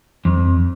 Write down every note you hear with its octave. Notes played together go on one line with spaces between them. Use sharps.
F2